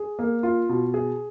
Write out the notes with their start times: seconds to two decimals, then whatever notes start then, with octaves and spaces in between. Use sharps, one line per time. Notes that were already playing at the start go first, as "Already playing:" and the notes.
Already playing: G#4
0.19 A#3
0.43 F4
0.69 B2
0.94 G#4